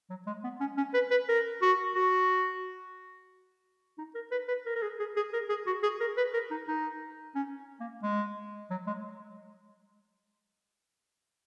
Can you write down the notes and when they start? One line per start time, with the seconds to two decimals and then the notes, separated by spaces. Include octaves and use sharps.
0.10 F#3
0.27 G#3
0.44 B3
0.61 C#4
0.77 C#4
0.94 B4
1.11 B4
1.29 A#4
1.62 F#4
1.96 F#4
3.98 D#4
4.15 A#4
4.31 B4
4.48 B4
4.66 A#4
4.76 A#4
4.82 G#4
5.00 G#4
5.16 G#4
5.33 A#4
5.49 G#4
5.67 F#4
5.83 G#4
6.01 A#4
6.17 B4
6.34 A#4
6.51 D#4
6.68 D#4
7.35 C#4
7.80 A#3
8.03 G#3
8.71 F#3
8.87 G#3